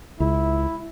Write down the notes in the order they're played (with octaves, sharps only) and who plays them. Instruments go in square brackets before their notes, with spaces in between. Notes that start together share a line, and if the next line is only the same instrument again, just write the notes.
[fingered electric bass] C#2 [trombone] E4